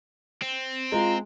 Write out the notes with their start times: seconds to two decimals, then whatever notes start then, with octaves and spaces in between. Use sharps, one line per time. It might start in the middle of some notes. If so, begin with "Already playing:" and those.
0.42 C4
0.92 G#3 F4 A#5